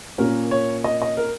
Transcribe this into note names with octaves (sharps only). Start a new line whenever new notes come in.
A#2 A#3 C#4 A#4
C#5
D#5
D#5
A#4